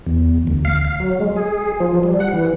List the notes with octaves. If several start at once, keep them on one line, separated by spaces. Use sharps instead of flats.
E2
D2
F5
F5
F#3
G#3
G#4
F3
G3
F#5
E3